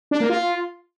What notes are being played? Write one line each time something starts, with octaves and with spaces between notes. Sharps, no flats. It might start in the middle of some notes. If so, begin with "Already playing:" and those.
D4
A#3
F4